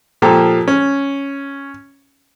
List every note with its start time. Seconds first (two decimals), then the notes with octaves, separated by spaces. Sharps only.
0.22 A#2 F3 G4 A4
0.68 C#4